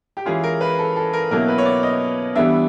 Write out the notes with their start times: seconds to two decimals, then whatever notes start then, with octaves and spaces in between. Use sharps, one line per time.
0.17 G4
0.26 E3 G#3 C#4 F4 G#4
0.44 A#4
0.61 B4
0.79 A4
0.96 A4
1.13 A#4
1.31 B2 F#3 A#3 C#4 E4 A#4
1.48 B4
1.58 C#5
1.65 D5
1.83 D#5
2.35 E3 G3 B3 D4 E5